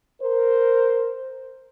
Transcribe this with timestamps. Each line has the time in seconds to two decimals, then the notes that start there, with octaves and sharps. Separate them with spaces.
0.21 A#4 C5